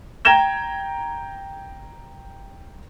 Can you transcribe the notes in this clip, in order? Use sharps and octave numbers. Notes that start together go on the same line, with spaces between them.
G5 A#5 G#6 A#6 E7 G7